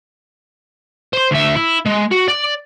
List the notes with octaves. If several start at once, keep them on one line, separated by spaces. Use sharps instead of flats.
C5 C6
D2 E5
E4
G#3
F#4
D5